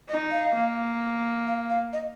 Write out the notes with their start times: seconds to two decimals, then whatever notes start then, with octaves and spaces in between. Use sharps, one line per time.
0.09 D#4 D#5
0.31 F5
0.55 A#3
1.47 F5
1.70 F5
1.93 D#5